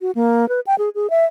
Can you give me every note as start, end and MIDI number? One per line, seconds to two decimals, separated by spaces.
0.01 0.11 66
0.15 0.48 58
0.49 0.60 71
0.67 0.75 79
0.78 0.89 68
0.95 1.10 68
1.10 1.25 76